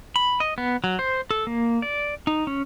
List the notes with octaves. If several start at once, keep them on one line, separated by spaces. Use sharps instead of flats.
B5
D#5
B3
F#3
C5
A4
A#3
D5
D#4
C#4